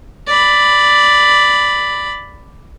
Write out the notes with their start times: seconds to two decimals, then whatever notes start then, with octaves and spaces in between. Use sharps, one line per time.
0.27 D5 B5